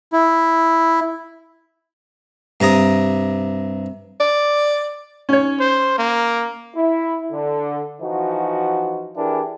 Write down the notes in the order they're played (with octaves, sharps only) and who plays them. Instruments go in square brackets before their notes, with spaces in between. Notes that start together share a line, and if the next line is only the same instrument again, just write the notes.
[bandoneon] E4
[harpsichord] G2 C3 A#5 D#6
[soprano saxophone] D5
[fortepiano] C#4 C#5
[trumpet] C5
A#3
[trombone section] E4
D3
E3 F3 D#4 F#4
E3 D4 E4 G4 G#4 A#4